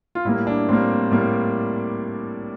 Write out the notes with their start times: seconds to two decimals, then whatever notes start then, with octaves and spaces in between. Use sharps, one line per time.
0.15 F4
0.25 A2 G3 A#3 E4
0.47 D4
0.68 A2 G3 A#3 C4
1.11 A2 G3 A#3